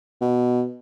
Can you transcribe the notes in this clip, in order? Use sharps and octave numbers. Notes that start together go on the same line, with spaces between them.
B2